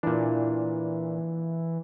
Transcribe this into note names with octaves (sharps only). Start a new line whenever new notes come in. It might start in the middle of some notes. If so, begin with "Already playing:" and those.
A#2 E3 D4